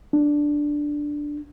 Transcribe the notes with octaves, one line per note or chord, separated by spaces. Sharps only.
D4